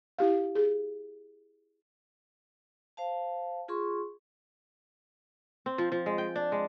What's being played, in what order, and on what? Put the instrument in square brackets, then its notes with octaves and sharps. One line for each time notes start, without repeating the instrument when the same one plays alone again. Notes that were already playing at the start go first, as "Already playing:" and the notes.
[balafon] E4 G4 F5
G#4
[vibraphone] C5 F5 A5
F4 G#4 C6 C#6
[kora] C4
F3
F3
G#3
G5
D4
G#3